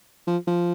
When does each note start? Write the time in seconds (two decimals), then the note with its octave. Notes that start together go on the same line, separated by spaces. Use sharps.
0.27 F3
0.47 F3